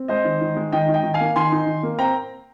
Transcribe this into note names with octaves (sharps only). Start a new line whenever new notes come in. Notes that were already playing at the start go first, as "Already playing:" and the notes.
Already playing: C4
G#3 C5 D#5
D#3
D#3
G#3
D#3 D#5 G5
D#4
D#5 G5
D#3
F5 G#5
A#3
D#3 G#5 C6
D#4
D#3
A#3
C4 G5 A#5